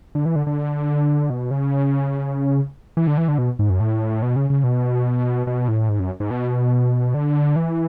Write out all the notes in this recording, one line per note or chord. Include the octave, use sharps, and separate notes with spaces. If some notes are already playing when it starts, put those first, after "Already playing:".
D3
E3
D3
D3
B2
C#3
E3
D3
E3
D3
B2
G#2
F#2
A2
B2
C#3
C#3
B2
B2
A2
G#2
F#2
G#2
B2
D3
E3